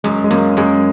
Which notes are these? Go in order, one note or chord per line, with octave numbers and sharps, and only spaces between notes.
F#2 G#3
G#3
F#2 A#3
F#2 G#3